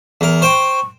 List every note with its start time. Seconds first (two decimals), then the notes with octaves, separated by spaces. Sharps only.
0.21 E2 A#4
0.42 C5 G5 C#6